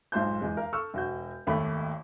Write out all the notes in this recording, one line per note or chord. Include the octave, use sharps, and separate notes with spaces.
B1 G#2 F4 C5 A5 G6
E2 G#3
A#4 F5
A4 C#6 E6 F6
E1 F#4 G6
G#1 D#2 A3 B5